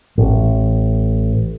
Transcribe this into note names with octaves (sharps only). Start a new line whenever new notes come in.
A1